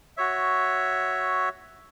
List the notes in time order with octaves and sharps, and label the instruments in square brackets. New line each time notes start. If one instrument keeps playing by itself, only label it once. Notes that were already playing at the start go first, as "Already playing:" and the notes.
[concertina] F#4 C#5 E5